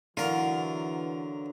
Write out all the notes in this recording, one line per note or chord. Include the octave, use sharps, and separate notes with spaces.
D3 E3 F#3 F4 A#4